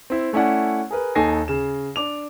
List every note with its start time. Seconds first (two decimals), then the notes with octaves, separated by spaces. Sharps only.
0.10 C4 E4
0.33 A3 C#4 E4 D5 F#5
0.91 G#4 A#4 B4
1.15 D#2 D#4 A4 G#5 A#6 C7
1.48 C#3 E7
1.96 D4 D6 F7